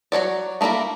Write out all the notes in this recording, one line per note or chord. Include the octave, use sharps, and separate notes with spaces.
F#3 A3 C#5 D5
A3 A#3 D#4 E4 A#4